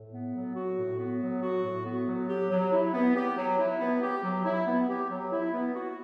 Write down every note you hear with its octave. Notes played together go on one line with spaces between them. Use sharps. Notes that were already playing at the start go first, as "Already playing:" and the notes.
Already playing: A2
B3
F#3
F#4
A2
B3
F#3
F#4
A2
B3
F#3
G4
F#3
E4
B3
G4
F#3
E4
B3
G4
F#3
E4
B3
G4
F#3
E4
B3
F#4